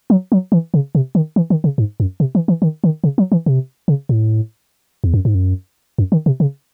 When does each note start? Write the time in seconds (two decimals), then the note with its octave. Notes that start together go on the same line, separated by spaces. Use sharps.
0.10 F#3
0.32 F#3
0.52 E3
0.74 C#3
0.95 C3
1.15 D#3
1.36 E3
1.50 D#3
1.64 C#3
1.78 G#2
2.00 F#2
2.20 C3
2.35 E3
2.48 E3
2.62 D#3
2.84 D#3
3.04 C#3
3.18 F#3
3.32 E3
3.46 C3
3.88 C#3
4.09 A2
5.04 E2
5.14 F#2
5.25 G#2
5.35 F#2
5.98 F#2
6.12 D#3
6.26 C3
6.40 C#3